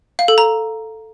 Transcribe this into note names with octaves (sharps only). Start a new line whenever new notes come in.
F5
A4
A#5